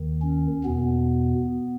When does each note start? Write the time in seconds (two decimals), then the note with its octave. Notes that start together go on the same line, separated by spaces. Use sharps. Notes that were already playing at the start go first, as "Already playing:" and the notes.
Already playing: D#2 D#3
0.22 C#4
0.64 E2 B2 B3